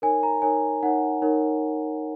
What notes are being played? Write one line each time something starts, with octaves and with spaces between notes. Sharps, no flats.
D#4 A#4 C#5 G#5
A#5
D#4 A#4 C#5 G#5
D#4 A#4 C#5 F#5
D#4 A#4 C#5